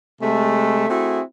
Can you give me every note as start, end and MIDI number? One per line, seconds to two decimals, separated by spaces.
0.21 0.86 48
0.21 0.86 56
0.21 0.86 57
0.89 1.21 57
0.89 1.21 60
0.89 1.21 64
0.89 1.21 66
0.89 1.21 68